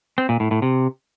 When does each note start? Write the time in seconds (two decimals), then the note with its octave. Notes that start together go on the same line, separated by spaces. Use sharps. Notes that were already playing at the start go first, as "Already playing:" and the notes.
0.18 C4
0.29 A#2
0.40 A2
0.51 A2
0.62 C3